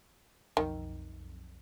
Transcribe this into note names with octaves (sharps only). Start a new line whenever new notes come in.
B1 F2 D#3